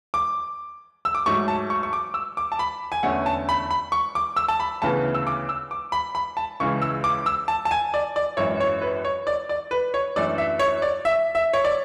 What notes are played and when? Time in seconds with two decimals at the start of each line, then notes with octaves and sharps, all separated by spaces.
0.14 D6
1.05 E6
1.15 D6
1.26 G#2 F#3 A3 C#6
1.48 A5
1.70 C#6
1.83 C#6
1.93 D6
2.14 E6
2.37 D6
2.52 A5
2.59 B5
2.92 G#5
3.03 E2 D3 A3 C#4 F#5
3.26 A5
3.49 B5
3.71 B5
3.92 C#6
4.15 D6
4.36 E6
4.48 A5
4.60 B5
4.82 D2 C#3 E3 B3 A5
5.14 E6
5.27 D6
5.49 E6
5.71 D6
5.92 B5
6.15 B5
6.37 A5
6.60 C#2 C#3 E3 C#6
6.82 E6
7.04 D6
7.26 E6
7.48 A5
7.65 A5
7.71 G#5
7.94 D5
8.16 D5
8.37 G#1 F#2 E3 C#5
8.60 C#5
8.81 B4
9.05 C#5
9.27 D5
9.49 D5
9.71 B4
9.94 C#5
10.16 F#2 E3 A3 D4 D5
10.38 E5
10.59 C#5
10.82 D5
11.05 E5
11.35 E5
11.53 C#5
11.64 D5